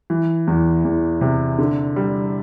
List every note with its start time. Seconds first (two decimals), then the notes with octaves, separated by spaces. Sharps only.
0.10 E3
0.47 E2
0.85 E2
1.21 C3
1.58 D3
1.96 G3